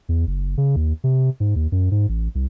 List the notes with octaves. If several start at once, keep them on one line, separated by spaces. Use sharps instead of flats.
E2
F#1
C#3
D#2
C3
G#2
D#2
F#2
G#2
A1
C2